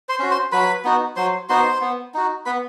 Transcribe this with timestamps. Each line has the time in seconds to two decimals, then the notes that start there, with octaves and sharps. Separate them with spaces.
0.09 C5 C6
0.20 C#4 F#4
0.31 C5 C6
0.52 F#3 B4 B5
0.84 B3 D#4 F#4
1.16 F#3 C5 C6
1.49 B3 D#4 F#4 C5 C6
1.81 B3
2.14 D#4 F#4
2.46 B3 B4 B5